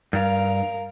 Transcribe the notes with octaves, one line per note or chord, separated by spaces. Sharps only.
G2 A#4 F5